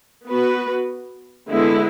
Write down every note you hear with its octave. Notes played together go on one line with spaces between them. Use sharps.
B3 F#4 B4
D3 G#3 B3 E4